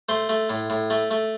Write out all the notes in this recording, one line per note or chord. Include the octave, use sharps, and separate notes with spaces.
A3 C5
A3
A2
A2
A3
A3